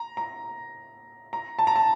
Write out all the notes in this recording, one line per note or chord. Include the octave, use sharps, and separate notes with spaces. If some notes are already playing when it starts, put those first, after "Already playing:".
Already playing: A#5
A#5
A#5
A5
A#5
A5